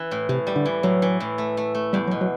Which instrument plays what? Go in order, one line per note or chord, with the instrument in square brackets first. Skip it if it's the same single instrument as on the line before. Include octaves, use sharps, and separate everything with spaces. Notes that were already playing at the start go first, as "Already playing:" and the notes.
Already playing: [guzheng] E3
A2
[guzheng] A2 [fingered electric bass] C3
[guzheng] G3
[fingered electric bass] D3
[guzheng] E3
[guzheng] A2 [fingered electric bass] F#3
[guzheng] E3
A2
A3
A3
A3
[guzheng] E2 [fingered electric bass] G3
[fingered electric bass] F#3
[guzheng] B2
[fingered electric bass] F#3